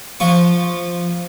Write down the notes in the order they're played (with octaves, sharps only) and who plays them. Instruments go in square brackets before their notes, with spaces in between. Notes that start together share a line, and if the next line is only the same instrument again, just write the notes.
[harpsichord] F3 C#6